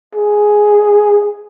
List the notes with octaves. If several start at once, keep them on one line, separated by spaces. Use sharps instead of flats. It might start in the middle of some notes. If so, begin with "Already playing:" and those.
G#4